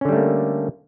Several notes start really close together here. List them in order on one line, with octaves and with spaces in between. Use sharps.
C#4 D3 G3 A3 A#3